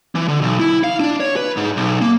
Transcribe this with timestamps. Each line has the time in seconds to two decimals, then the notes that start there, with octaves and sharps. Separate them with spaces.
0.15 E3
0.28 D3
0.41 B1
0.60 E4
0.84 F5
1.00 D4
1.20 C#5
1.36 B4
1.57 G#2
1.77 B1
2.01 A#3